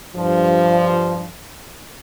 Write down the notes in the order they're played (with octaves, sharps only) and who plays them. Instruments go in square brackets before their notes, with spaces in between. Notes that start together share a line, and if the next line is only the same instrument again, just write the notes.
[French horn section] G2 F3